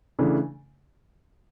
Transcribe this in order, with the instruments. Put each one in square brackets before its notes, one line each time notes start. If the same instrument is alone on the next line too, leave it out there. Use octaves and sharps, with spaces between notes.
[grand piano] C#3 E3 A3 D4